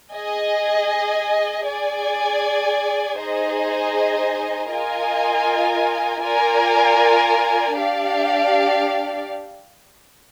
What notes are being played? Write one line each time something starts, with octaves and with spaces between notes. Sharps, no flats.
G#4 D#5 G#5
G#4 D5 G#5
D#4 G#4 C5 D#5 G#5
F4 A#4 D#5 G#5
F4 A#4 D5 G#5
D4 G4 D5 F5